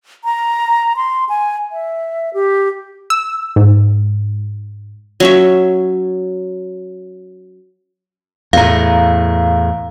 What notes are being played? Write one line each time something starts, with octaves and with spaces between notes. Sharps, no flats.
A#5
C6
G#5
E5
G4
E6
G#2
F#3 C#4 E5
E2 A2 F5 A#5